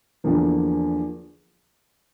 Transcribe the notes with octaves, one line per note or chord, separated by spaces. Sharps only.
E2 D3 F3 A#3